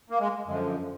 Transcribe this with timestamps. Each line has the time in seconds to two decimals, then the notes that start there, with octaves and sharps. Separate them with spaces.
0.10 A#3
0.20 G#3
0.48 F#2 D3 F3 G#3